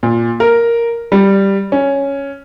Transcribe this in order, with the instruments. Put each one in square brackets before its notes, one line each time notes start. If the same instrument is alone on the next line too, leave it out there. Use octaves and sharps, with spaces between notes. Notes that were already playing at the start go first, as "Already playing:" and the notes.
[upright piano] A#2
A#4
G3
C#4